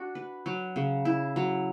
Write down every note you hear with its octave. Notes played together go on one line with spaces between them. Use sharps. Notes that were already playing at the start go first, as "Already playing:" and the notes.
Already playing: D4 F#4
B4
F#3
C#3
E4
F#3